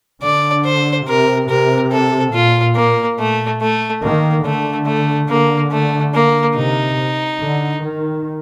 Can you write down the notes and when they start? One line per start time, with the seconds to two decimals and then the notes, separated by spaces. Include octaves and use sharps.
0.22 D3 D5
0.65 C5
1.07 C3 A#4
1.49 C3 A#4
1.92 A4
2.34 A#2 F4
2.76 A#3
3.19 A3
3.61 A3
4.03 D#3 A#3
4.45 D3 A3
4.87 A3
5.29 D3 A#3
5.72 A3
6.14 A#3
6.56 C3 D#4
7.40 D3
7.82 D#3